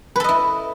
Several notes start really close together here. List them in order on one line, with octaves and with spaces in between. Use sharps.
B4 A4 D#5 E4